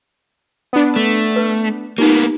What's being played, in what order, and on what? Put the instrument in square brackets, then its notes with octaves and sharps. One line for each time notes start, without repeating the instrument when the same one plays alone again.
[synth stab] B3 D4
[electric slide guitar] A3
[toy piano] B4
[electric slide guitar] A#3 B3 [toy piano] D#4 F4 G4